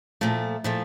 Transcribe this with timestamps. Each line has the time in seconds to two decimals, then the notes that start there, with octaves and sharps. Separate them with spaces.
0.21 A#2 F3 A3
0.64 A#2 F3 A3